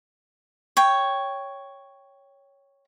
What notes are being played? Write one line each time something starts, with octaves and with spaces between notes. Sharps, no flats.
C#5 G5